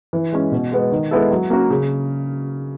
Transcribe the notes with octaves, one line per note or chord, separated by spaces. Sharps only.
E3
G#3 C#4
B2
G#3 B3
D#3
G#3 B3 E4 A4
F#3
A#3 C#4 F#4 A#4
C#3